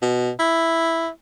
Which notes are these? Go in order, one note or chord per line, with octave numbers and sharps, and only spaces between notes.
B2
E4